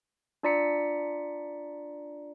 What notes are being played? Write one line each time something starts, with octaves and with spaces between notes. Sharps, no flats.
D4 F4 D5 A#5 B6 C#7